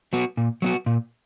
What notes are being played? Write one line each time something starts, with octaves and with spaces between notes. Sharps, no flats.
F#3 B3 F#4
A#2
F#3 B3 F#4
A#2